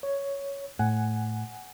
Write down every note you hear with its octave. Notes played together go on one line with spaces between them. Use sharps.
C#5
A2 F#5 G#5